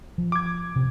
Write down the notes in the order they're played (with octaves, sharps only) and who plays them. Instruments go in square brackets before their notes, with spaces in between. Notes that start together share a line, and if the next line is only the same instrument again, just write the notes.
[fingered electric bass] F3
[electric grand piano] D6 G#6
[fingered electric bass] C3